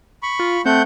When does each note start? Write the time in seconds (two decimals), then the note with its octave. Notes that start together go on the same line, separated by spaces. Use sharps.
0.23 B5 C#6
0.39 F4
0.66 A3 C4 F#5 G6